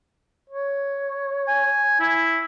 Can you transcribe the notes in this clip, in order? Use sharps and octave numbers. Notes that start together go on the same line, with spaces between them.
C#5
G#5
E4